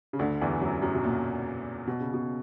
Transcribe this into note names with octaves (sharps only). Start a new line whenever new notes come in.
C#3
D2 D3
E2 E3
F#2 F#3
F#2 F#3
B2
A#2
B2
C#3
B2